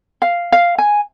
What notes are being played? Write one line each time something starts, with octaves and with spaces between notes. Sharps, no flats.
F5
F5
G#5